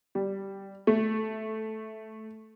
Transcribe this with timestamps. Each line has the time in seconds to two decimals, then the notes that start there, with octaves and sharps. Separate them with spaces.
0.15 G3
0.87 A3